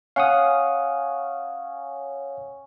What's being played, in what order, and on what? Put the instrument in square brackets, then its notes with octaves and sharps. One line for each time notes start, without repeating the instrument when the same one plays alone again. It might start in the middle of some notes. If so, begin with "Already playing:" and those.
[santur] C#4 [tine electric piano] F5 F#5 D#6